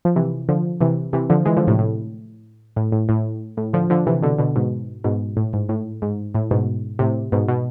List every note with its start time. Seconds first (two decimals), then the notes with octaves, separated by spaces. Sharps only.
0.05 F3
0.16 C3 E3
0.48 D3 F3
0.81 C3 E3
1.13 C3 E3
1.30 D3 F3
1.45 E3 G#3
1.57 D3 F3
1.67 A2 C3
1.79 A2
2.76 A2
2.92 A2
3.09 A2
3.57 A2
3.73 D3 F3
3.90 D3 F3
4.07 C3 E3
4.22 B2 D3
4.38 B2 D3
4.56 G#2 B2
5.04 G#2 B2
5.37 A2
5.53 G#2
5.69 A2
6.02 G#2
6.35 A2
6.51 G#2 B2
6.99 A2 C3
7.32 G#2 B2
7.48 B2